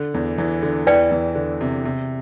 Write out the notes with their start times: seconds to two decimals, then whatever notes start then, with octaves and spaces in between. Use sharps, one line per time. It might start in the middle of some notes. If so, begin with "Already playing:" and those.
Already playing: D3
0.14 E2 E3
0.38 E2 E3
0.63 D3
0.87 E2 E3 B4 D5 G5
1.11 E2 E3
1.35 D3
1.61 C3
1.85 C3